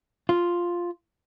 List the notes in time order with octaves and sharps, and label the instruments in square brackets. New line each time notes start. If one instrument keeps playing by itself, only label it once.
[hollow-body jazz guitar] F4